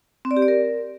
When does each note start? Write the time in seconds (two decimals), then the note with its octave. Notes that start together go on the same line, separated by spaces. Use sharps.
0.25 C4
0.31 D5
0.37 G4
0.42 D5
0.48 A#4